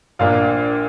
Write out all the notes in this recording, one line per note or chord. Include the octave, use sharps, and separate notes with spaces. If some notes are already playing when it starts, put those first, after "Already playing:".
A#1 A#2 A#3 D4 F5